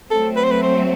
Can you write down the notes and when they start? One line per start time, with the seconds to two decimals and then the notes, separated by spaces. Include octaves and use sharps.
0.11 F#3 A3 C4 A4
0.37 B4
0.44 C5
0.52 B4
0.63 C5